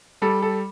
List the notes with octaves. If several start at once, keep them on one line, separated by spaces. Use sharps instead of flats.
G3 A4
A4